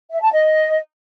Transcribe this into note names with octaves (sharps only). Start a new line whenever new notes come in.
E5
A5
D#5